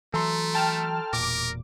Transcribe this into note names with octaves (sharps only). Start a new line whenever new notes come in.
E3 F#3 A3 A4 A#5 C6
G5 A5 F6
E1 A#2 A#4 D6